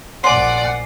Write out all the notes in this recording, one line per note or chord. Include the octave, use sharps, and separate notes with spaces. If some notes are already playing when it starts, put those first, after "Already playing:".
A#1 D5 F#5 G#5 C6 C7